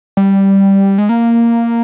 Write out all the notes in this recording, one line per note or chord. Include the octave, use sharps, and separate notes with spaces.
G3
G#3
A#3